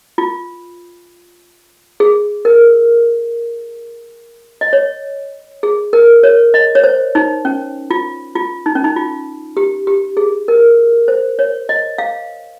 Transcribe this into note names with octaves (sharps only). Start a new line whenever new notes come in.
F4
G#4
A#4
D#5
C#5
G#4
A#4
C#5
D#5
C#5
C5
D#4
C#4
F4
F4
D#4
C#4
D#4
F4
G4
G4
G#4
A#4
C5
C#5
D#5
F5